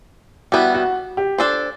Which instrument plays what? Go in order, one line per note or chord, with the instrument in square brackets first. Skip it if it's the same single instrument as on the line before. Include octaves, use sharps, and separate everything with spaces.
[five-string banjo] G3 B3 E4 [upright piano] F#4
[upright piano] F#4
G4
[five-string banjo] D4 A4 C5